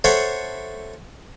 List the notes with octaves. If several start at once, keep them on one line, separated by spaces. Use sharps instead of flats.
A4 C5 C#5 E5 F#5 B5